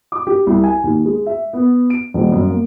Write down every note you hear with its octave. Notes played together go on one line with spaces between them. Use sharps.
D6
G4
C2
G#5
D#2
G#3
E5
B3
D7
D#1
F#2
A#3